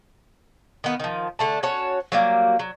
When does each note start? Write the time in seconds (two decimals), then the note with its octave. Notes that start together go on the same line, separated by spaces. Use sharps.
0.84 D#3 B3
1.00 D#3 F3
1.39 D3 A3 A5
1.63 C#4 F#4 C#5 A5
2.12 F#3 G3 A#3
2.59 F#3